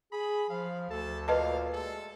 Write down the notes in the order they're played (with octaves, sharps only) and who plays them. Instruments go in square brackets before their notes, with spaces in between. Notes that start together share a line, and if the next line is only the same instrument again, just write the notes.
[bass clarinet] G#4 [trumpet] B5
[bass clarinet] F3 [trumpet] F5
[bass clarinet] D2 [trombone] A4 [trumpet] A5
[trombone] A#2 [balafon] B4 D#5 A5 [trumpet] F5
[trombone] G#3 [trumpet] A4